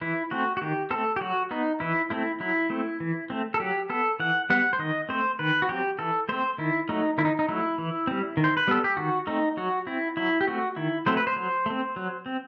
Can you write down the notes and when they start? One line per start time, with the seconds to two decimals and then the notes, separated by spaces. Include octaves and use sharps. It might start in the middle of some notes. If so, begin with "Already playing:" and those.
0.01 E3 E4
0.31 A3 C4 F#4
0.57 F#4
0.61 D#3 G4
0.91 A3 C4 A4
1.16 G4
1.21 F#3 F#4
1.51 B3 D#4
1.80 E3 E4
2.10 A3 C4 E4
2.40 F#3 E4
2.70 A3 C4
3.00 E3
3.30 A3 C4
3.54 A4
3.60 F#3 G4
3.90 B3 A4
4.20 E3 F#5
4.50 G3 B3 F#5
4.73 C5
4.79 D#3 D#5
5.09 A3 C4 C5
5.39 D#3 B4
5.62 F#4
5.69 F#3 C4 G4
5.99 E3 A4
6.29 A3 C4 C5
6.58 D#3 E4
6.89 F#3 A3 D#4
7.18 D#3 E4
7.25 D#4
7.39 D#4
7.49 F#3 A3 E4
7.78 E3
8.07 G3 C4
8.37 D#3
8.44 C5
8.57 B4
8.67 G3 B3 A4
8.84 G4
8.97 D#3 F#4
9.27 A3 C4 D#4
9.57 F#3 F#4
9.87 C4 E4
10.17 F#3 E4
10.41 G4
10.47 A3 C4 F#4
10.76 D#3 E4
11.06 F#3 A3 C4 C5
11.17 B4
11.27 C5
11.36 F#3
11.66 A3 C4
11.96 F#3
12.26 C4